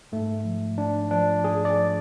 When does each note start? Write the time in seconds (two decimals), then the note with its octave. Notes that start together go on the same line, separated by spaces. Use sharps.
0.12 G#2 A3
0.44 F3
0.78 G#2 D4
1.11 F3 D4
1.44 G#2 G#4
1.65 D5
1.77 F3